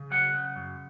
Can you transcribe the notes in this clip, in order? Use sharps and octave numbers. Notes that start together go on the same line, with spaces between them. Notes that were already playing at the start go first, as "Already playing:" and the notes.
Already playing: C#3
F#3 F#5
C#3
F#2